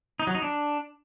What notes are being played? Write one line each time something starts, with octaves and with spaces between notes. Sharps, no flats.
D#4
F#3
D#4
D4